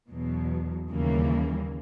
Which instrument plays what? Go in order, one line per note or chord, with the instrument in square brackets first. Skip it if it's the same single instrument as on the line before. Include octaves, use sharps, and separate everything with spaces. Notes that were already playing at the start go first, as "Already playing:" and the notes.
[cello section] E2 B2 F#3
D#2 C#3 E3 G3 A#3